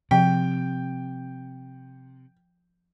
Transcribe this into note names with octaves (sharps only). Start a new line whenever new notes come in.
C3 F3 G5